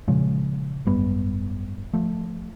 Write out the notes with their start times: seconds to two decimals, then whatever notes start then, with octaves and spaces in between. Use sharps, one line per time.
0.08 A#2 C#3 F3 G#3
0.86 G#1 F#2 G3 B3
1.93 F3 A3